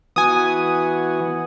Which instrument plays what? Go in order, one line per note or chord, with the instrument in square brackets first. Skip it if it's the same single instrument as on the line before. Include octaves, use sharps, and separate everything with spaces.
[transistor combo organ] E3 B3 F#4 [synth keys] G#5 D#6